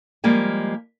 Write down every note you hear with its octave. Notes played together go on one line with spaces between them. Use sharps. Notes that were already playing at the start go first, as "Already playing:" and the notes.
F3 G3 G#3 A#3 G#5